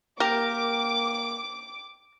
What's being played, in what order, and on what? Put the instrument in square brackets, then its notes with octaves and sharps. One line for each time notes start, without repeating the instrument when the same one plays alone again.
[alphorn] A#3 [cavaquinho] G4 [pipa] A#4 [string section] D6